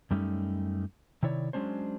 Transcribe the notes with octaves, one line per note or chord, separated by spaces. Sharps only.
F#2 G3 A3 C#4 D#4
C3 D#3 E4 C#5 D5
F#3 G#3 C#4 D4 C5